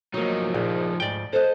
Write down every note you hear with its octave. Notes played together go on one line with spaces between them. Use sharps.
F3 F#3 A#3 D#4
A#1 A#2
D2 G#2 F3 D5 G5
A4 C5 D#5